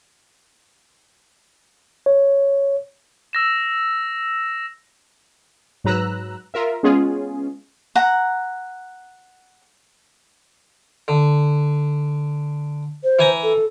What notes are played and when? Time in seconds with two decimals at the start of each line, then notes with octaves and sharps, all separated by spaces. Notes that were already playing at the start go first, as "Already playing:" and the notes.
2.06 C#5
3.33 E6 A#6 E7
5.84 G#2 F#3 B4 A#5 E6 F#6
6.54 F4 A#4 E5
6.83 G#3 B3 C#4 F4 G#4
7.95 F#5 A#5
11.08 D3
13.03 C5
13.19 E3 G#5 A#5
13.43 A4